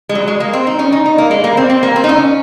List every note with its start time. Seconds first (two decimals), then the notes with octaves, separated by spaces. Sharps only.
0.09 G#3
0.15 F#3
0.28 G#3
0.40 A#3
0.53 C4
0.67 D#4
0.79 C#4
0.92 D#4
1.06 D#4
1.18 A#3
1.31 G#3
1.44 A#3
1.57 C4
1.70 C4
1.83 A#3
1.96 C4
2.04 D#4
2.09 C#4